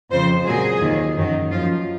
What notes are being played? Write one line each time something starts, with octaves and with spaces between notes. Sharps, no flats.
F2 C#3 F3 C5
A#2 F#3 G#4
D#2 D#3 F#3
F#2 D#3 F#3
F#2 F3 F4